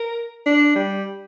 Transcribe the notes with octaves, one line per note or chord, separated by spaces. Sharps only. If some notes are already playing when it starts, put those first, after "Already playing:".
Already playing: A#4
D4
G3